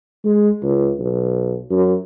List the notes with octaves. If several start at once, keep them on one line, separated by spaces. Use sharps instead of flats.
G#3
C#2
B1
F#2